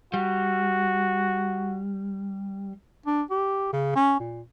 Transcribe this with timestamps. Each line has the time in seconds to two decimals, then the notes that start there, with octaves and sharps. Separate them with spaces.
0.14 G3 F#4
3.06 D4
3.31 G4
3.73 C#3
3.96 C#4
4.20 A#2